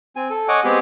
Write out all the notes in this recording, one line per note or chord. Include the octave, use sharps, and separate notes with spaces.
C4 G#5
A4
C#5 D#5 F#5 G#5 D6
G#3 B3 C4 G4 G#4